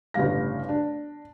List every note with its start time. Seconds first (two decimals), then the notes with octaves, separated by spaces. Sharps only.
0.14 G1 A2 C#3 G3 F5 A#6
0.69 D4